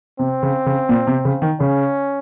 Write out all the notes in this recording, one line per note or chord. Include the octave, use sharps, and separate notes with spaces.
C3 C4
C#3
C#3
A#2
C3
C#3
D#3
C#3 C#4